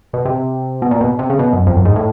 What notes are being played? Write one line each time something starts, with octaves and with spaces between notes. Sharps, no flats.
B2
C3
B2
A#2
B2
C3
C#3
B2
F#2
F2
F#2
G#2
A2